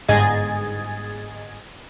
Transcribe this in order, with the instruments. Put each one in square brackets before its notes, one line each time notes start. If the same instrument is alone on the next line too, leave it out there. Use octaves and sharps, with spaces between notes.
[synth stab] G1 G#2 G#4 D#5 G#6 A6